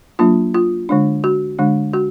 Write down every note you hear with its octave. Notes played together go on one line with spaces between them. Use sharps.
F#3 A#3 D4 F4
F4
D3 G#3 D4
F#4
D3 G#3 D4
F#4